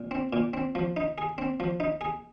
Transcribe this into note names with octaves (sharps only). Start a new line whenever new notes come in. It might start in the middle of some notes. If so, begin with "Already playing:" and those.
Already playing: A#2
C4
A#2
C4
F3
D#4
G#4
C4
F3
D#4
G#4